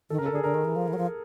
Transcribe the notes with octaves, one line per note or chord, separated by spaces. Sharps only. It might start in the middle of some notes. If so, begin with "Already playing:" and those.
D#3 A4
C#3 A#4
A4
D3
G#4
D3 A#4
D#3
E3
F3
E3
F#3
F3